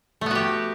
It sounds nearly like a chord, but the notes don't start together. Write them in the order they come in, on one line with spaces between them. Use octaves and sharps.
A3 B3 F#4 G4